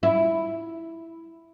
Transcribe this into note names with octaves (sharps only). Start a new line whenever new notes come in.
E4